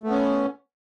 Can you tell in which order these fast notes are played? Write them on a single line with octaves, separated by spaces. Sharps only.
A3 B3 C#4